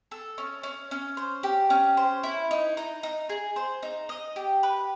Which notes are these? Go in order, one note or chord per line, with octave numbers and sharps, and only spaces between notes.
A4
C#4
C#4
C#4
C5
G4
C#4
C5
E4
D#4
D#4
D#4
G#4
C5
D#4
D#5
G4
B4